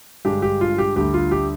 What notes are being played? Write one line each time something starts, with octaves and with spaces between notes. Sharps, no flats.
G2 D3 G#3 D4 G4
G4
F4
G4
D2 D3 G3 G4
F4
G4